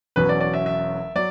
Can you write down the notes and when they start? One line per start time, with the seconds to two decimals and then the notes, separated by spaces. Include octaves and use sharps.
0.16 E1 E2 B2 F#3 C#4 B4
0.29 D5
0.40 D5
0.54 E5
0.66 E5
1.16 F#3 D5